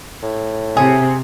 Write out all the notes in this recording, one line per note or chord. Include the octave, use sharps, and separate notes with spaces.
A2
C3 G#4